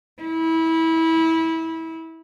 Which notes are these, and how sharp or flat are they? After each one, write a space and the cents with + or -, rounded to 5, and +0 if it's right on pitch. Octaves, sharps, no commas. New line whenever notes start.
E4 -20